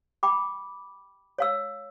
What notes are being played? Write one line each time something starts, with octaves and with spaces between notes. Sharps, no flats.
G5 B5 D6
C#5 F5 E6